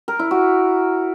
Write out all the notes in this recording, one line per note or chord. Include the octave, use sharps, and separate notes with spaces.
A#4
E4
F#4